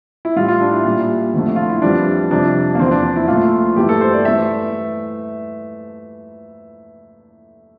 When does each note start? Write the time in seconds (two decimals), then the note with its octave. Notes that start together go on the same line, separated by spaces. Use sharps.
0.25 E4
0.36 A2 G3 F4
0.48 F4
0.61 D4
0.73 E4
0.85 A#2 G3
1.34 F2 D3 A3
1.56 F4
1.69 E4
1.82 F2 E3 G3 D4
2.31 F2 C3 G3 D4
2.75 A#3
2.79 E2 D3 F3 C4
2.91 D4
3.04 D4
3.16 E4
3.28 A#2 F3 A3 F4
3.76 G2 E3 A3 G4
3.89 A4
4.01 C5
4.13 D5
4.25 E3 A3 E5